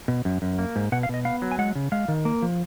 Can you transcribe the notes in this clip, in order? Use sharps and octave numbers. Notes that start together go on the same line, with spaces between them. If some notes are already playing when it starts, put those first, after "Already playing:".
B2
F#2
F#2
A#3
G#2
B2 F#5
F5
B2 D#5
B3 F5
F#3
G#5
G#3 F#5
C#3
G#3 F5
D#3
A#3
F3